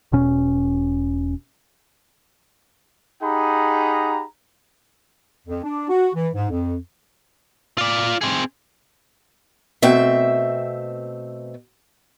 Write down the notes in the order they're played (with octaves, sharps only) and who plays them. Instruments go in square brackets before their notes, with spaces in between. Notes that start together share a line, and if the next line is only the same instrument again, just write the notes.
[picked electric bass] E1 B2 C#4
[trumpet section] D#4 G4 G#4 F#5 A#5 B5
[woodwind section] F2
D4
F#4
E3
G#2
F2
[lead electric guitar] F4 D5
C4 G#4
[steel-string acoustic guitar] B2 A3 C4 E5